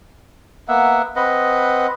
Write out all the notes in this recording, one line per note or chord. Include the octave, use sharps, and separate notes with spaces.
A#3 B3 E5 F#5
C4 B4 D#5 F#5